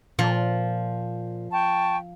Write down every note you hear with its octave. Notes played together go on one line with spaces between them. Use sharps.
A#2 F3
G5 A5 C#6